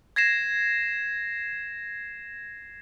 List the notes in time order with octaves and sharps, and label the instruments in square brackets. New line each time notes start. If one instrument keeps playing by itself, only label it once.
[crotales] G#6 A#6 C7 E7